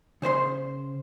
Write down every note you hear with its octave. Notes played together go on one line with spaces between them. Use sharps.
C#3 C5 C#5 C6